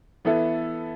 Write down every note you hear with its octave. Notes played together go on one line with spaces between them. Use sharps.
E3 B3 E4 A4